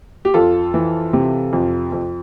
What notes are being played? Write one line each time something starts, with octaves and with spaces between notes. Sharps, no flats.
G4
F2 F4 A4
E3
C3
F2
F2